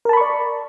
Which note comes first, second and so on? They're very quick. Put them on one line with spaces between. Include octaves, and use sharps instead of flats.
A#4 A5 B5 C#6 D5